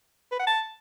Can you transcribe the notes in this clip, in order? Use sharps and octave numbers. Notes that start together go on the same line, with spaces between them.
B4
F#5
A5